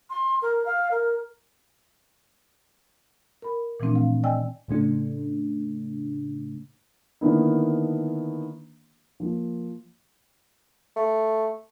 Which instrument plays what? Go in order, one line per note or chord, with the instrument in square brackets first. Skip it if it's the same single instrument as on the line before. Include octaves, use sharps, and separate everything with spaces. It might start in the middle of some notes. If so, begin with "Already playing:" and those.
[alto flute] C6
A#4
F5
A#4
[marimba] A#4 B5
A#2 E3 F3 A3 C4 D4
F5
D5 D#5 G5 G#5 E6
[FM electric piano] A2 C#3 A3 D4
[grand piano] D3 D#3 A#3 B3 D4 E4
F3 A#3
[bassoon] A3